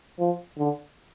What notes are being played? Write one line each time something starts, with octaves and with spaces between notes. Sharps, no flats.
F3
D3